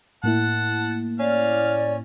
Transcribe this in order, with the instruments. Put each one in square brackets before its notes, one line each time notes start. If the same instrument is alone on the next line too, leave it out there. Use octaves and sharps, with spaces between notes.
[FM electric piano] A2 A#3 E4 [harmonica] F#5 A5
[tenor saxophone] C#4 [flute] D5 [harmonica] F5